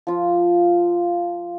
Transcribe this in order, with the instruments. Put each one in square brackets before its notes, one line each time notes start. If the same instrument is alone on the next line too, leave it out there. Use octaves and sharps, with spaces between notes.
[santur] F3 F4